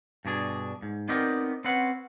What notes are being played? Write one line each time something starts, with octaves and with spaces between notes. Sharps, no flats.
G2 B2 D4 G#4
G#2
B3 C4 D#4 G4 A#4 D5
C4 C#4 B4 C5 F#5